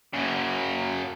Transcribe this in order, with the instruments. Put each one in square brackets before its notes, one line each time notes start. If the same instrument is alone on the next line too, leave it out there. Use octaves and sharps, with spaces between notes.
[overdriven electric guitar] F#2 C#3